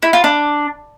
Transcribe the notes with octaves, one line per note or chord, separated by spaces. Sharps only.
E4
F4
D4